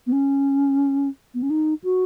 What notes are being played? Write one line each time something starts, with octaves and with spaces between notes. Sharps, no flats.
B3
C#4
B3
C#4
D#4
F#4